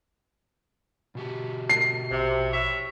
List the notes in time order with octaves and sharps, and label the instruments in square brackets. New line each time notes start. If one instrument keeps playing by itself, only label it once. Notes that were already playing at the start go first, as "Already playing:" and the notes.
[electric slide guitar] B2 F#4 G4
[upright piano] C7
[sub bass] A#1 [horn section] C3
[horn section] E4 C#5 E5